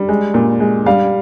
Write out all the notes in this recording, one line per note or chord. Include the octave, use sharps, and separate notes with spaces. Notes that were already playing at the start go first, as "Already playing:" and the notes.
Already playing: G3
G#3
A#2
G#3
G3 F5